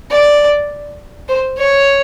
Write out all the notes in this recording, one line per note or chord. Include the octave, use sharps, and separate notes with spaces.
D5
C5
C#5